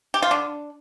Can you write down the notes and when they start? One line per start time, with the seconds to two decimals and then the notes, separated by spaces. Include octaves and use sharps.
0.14 G4
0.22 F4
0.31 D3 D4